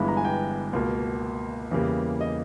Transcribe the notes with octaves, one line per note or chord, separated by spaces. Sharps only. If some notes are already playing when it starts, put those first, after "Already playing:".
Already playing: G1 G2 E3 G#3 B3 B5
A#5
G#5
G5
C#2 B2 A#3
E2 C#3 G3 A#3
D#5